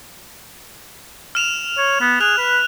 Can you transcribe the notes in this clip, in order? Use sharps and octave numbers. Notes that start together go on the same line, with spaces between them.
F6 E7 F7
C#5
B3
G#4 F#6 F7
B4